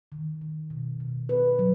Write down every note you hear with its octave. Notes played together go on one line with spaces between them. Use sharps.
D#3
D#3
B2
B2
B4
F#3